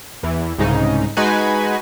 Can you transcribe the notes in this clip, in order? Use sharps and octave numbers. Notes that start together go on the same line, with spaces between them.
E2 E3
C2 G#2 C#3 D#4
G#3 D#4 F#4 B4 G#5